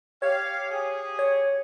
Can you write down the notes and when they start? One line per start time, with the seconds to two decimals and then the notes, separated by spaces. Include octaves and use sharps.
0.22 G4 C#5 F5
0.70 G4 G#4
1.19 C#5